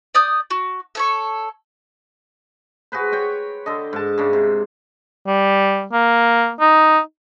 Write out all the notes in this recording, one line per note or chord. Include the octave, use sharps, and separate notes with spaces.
D5 D#6 G6
F#4
A4 C#5 C#6
F#4 G#4 B4 C5
C#5 G5 C#6
D3 A4 D#5
G#2 A5
G#2 C#3 D4
C3
G3
A#3
D#4